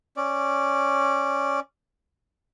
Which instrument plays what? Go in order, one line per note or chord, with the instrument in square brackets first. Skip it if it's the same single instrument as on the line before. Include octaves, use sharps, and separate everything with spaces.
[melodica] C#4 D5